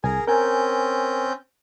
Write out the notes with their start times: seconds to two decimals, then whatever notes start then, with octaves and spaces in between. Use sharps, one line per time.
0.04 C2 G#4 A#4 G#5
0.28 C4 C#4 A#4 G#5 G6